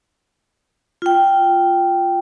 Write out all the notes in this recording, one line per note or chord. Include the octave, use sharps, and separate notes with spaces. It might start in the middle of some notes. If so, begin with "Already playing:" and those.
F4 G5